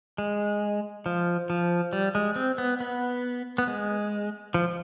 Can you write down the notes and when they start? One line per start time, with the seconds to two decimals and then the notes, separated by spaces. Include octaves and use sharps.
0.18 G#3
1.06 F3
1.50 F3
1.93 G3
2.15 G#3
2.36 C4
2.58 B3
2.80 B3
3.58 B3
3.68 G#3
4.54 F3